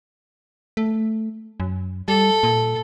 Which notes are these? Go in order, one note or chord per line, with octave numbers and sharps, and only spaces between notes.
A3
F#2
G3 A4
A#2